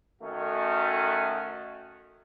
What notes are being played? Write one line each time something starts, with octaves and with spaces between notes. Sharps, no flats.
D#3 A3 C#4 F#4